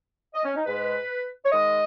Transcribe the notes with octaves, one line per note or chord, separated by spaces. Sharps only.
D#5
C#4
D#4
G#2 G#3 B4
C#5
G#2 D#3 G#3 D#5